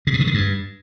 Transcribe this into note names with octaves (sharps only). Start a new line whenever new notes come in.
C#3
B2
D#3
D3
G2